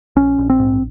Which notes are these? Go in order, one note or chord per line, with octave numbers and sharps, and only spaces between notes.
A#1 C#4
A#1
C4
G#2